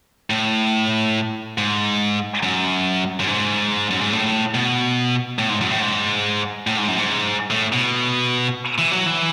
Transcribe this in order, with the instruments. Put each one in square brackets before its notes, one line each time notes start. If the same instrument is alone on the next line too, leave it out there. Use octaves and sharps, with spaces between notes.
[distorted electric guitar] A2
G#2
F#2
F#2
G#2
F#2
G#2
A2
B2
A2
G#2
F#2
A2
G#2
A2
G#2
F#2
G#2
A2
B2
E3
F#3
E3